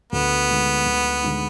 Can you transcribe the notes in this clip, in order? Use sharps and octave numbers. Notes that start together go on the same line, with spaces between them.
D2 B3
D3 G#3 D#4
D2
D3 G#3 D#4